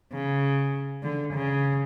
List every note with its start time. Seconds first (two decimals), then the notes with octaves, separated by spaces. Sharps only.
0.13 C#3
1.03 D3
1.33 C#3